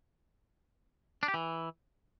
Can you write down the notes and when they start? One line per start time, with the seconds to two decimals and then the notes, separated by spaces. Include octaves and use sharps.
1.23 D4
1.28 G4
1.34 E3